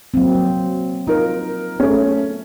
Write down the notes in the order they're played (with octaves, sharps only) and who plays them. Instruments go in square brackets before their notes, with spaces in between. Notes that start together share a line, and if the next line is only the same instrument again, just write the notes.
[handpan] F#3 A#3 C4
F#3
[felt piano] D#4 A#4 [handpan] F4
[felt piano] A3 C#4